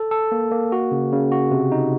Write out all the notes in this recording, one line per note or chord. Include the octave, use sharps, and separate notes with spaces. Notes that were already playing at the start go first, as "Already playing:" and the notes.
Already playing: A4
A4
A#3
A#3
F#4
C#3
C#3
F#4
C3
D#4